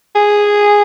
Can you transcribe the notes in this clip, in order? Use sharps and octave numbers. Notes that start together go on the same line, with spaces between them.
G#4